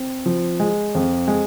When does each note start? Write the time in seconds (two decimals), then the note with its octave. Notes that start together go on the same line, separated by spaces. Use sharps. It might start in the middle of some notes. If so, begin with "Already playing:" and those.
Already playing: C4
0.26 F3
0.60 G#3
0.95 F2
1.28 G#3